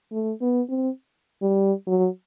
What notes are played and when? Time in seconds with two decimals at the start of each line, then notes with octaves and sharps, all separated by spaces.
0.12 A3
0.41 B3
0.69 C4
1.42 G3
1.87 F#3